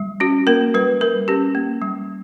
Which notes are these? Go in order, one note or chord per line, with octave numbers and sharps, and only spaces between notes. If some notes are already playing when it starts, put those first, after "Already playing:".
Already playing: G3
C#4 F#4
A#3 A#4
G3 B4
G3 A#4
C#4 G4
A#3
G3